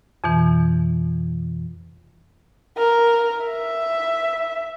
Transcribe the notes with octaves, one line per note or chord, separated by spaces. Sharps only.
F2 B2 E3
A#4
E5